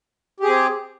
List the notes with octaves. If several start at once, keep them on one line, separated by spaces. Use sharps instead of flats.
C4 G4 G#4